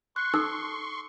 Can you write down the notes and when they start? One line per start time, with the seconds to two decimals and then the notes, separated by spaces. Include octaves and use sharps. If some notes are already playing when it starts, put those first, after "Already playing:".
0.16 C6 C#6 F#6
0.34 D#4 A4 E6